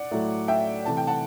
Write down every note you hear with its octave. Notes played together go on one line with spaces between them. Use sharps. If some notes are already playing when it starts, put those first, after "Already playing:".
Already playing: D5 F#5
A2 F#3 A3 E4
E5 G5
C3 E3 A3 A5
G5
F#5 A5